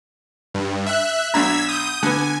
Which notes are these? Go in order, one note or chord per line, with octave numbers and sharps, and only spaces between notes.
G2
E5 F#6
B1 D4 A#5 E6 G#6 B6
D#6 G6
D3 B3 G#5